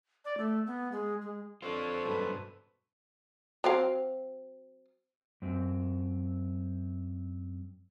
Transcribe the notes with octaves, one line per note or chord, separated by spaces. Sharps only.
D5
A3
B3
G#3
G#3
D3 C4 F4 C5 C#5
G2 B2 F#3 A4 B4
F#3 C4 F5
F#2 C4